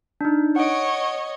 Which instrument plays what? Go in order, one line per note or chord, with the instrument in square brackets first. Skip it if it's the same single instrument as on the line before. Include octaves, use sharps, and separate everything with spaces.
[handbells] D4 D#4
[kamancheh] C#5 D#5 [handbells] F#5 D7